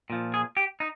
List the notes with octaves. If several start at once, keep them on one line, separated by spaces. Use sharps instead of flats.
A#2 F3
G#4
G4
D#4